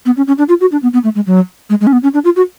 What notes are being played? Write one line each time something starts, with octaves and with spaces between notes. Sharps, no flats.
B3
C#4
C#4
D4
F4
F#4
D4
B3
B3
A3
G#3
F#3
G#3
G#3
C#4
B3
C#4
D4
F4
F#4